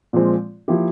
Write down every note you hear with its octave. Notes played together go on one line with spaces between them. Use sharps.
A#2 F3 G#3 C4
F3 A#3 E4 G4